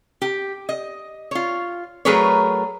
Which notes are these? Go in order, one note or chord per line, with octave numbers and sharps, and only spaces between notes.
G4
D#5
F4 C#5
F#3 A3 G#4 A#4 B4 C#5